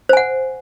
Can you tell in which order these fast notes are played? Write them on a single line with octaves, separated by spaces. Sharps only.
C5 G#5 F#5